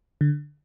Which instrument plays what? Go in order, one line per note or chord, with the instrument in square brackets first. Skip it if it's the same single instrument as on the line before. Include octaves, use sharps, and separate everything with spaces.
[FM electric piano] D3